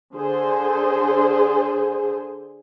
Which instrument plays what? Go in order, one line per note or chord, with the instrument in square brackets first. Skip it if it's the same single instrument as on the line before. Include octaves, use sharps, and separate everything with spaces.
[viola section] D3 G#4 C5